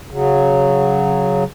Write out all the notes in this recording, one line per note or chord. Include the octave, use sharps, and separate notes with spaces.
C#3 F#3